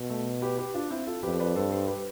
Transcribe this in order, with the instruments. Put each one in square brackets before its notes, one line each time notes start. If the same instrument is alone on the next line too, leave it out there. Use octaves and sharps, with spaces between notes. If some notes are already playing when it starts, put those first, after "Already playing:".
Already playing: [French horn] B2
[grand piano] A3
G4 B4
G4 B4
D4 F4
C4 E4
F4 A4
[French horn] F2 [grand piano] G4 B4
[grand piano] B4 D5
[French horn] G2 [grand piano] A4 C5
[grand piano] A4 C5
G4 B4